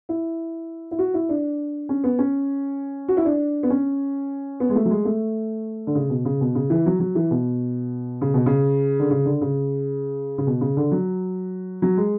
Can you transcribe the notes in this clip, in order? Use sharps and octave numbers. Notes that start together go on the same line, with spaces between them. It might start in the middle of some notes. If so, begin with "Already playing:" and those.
E4
E4
F#4
E4
D4
C#4
B3
C#4
F#4
E4
D4
B3
C#4
B3
G#3
A3
F#3
G#3
A3
D3
C#3
B2
C#3
B2
C#3
E3
F#3
F#3
E3
B2
C#3
B2
C#3
D3
C#3
D3
C#3
C#3
B2
C#3
D3
F#3
F#3
G#3